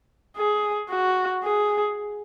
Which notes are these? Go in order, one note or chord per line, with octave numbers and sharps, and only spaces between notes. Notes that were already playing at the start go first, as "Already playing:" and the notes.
G#4
F#4
G#4